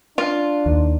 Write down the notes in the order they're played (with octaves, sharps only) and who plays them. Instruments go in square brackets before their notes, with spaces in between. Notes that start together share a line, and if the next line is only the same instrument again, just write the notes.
[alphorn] D4 [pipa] F4
[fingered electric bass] D#2